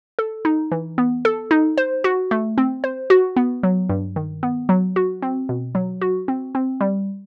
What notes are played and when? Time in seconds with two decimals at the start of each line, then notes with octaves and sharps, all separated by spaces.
0.19 A4
0.45 D#4
0.72 E3
0.98 B3
1.25 A4
1.51 D#4
1.78 C5
2.04 F#4
2.31 A3
2.58 C4
2.84 C5
3.10 F#4
3.36 B3
3.63 F#3
3.89 G2
4.16 D#3
4.43 B3
4.69 F#3
4.96 F#4
5.22 C4
5.49 B2
5.75 F#3
6.02 F#4
6.28 C4
6.55 C4
6.81 G3